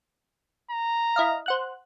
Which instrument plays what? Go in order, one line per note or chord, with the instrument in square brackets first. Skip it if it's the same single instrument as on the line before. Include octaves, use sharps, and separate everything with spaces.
[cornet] A#5
[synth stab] E4 D#5 F5
C5 F#5 F#6